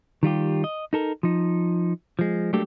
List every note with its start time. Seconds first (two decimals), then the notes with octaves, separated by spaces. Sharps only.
0.23 D#3 G3 F4 G4
0.64 D#5
0.93 D#4 A4 A#4
1.23 F3 D#4
2.19 F3 G#3
2.53 F#3 G3 A3 A#3 D4 G4